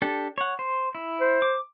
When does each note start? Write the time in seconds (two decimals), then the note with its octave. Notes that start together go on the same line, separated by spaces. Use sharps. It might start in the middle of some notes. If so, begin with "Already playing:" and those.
0.02 D4 G4 A4
0.38 C#5 F#5
0.59 C5
0.95 E4
1.21 C5
1.42 D6